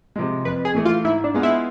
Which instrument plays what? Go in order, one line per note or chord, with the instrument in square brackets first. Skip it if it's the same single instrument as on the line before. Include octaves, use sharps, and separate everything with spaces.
[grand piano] C3 F3 G#3
[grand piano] F2 [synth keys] B4
[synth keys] G#4
[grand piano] E3 A3
[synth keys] F4
[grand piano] G#2 [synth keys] E4
[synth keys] D4
[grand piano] G#3 B3 F4 G#4
[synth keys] E4